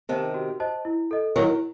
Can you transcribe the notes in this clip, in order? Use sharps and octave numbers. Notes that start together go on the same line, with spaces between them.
C3 D#3 C5 D#5 A5
F#4
C5 D#5 A5
E4
A4 D#5
D#3 F#3 E4